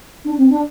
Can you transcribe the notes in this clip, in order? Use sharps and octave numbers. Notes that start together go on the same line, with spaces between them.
D4
C4
D4